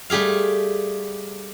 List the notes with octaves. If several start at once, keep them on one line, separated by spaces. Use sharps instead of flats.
G3 A3 G4 G#4 F5